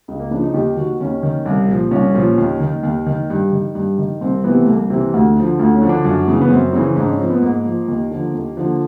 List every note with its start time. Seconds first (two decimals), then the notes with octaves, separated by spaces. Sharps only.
0.08 C#2
0.19 A#3
0.31 C#3 F3 D4
0.43 D#4
0.54 D#2 G4
0.76 D#3 F#4
1.00 D#2 C#4
1.23 D#3
1.46 C2
1.68 A#2 F3
1.91 C2 C#4
2.14 A#2 F3
2.38 D#2
2.60 D#3
2.83 D#2
3.06 D#3
3.30 G2
3.52 D#3
3.75 G2
3.98 D#3
4.20 C2 C4
4.44 C3 E3 B3
4.60 A3
4.67 C2 A#3
4.90 C3 E3
5.13 D2
5.36 D3 F3
5.59 D2
5.74 C#4
5.82 D3 F3
5.89 D4
6.05 F#2
6.27 C#3 E3
6.41 B3
6.50 F#2 C4
6.73 C#3 E3
6.96 G#2 D4
7.07 C#4
7.19 F3 C4
7.30 B3
7.42 G#2 A#3
7.65 F3
7.88 D#2
8.11 D3 F3
8.34 D#2
8.57 D3 F3